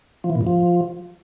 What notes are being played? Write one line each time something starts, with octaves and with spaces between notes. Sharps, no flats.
F3
E3
A#2
G2
F3